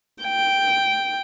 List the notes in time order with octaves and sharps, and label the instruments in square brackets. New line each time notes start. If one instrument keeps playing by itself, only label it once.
[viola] G5